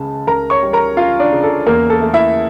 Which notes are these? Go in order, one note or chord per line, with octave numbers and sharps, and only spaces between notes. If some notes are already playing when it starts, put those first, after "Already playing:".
Already playing: C#2 C#3 C#4 A5
C#2 A#4 A#5
C#5 C#6
G3
A#4 A#5
C#4 F4 F5
D4 D5
C#3
A4
E2 A#3 A#4
A4
A3
E4 E5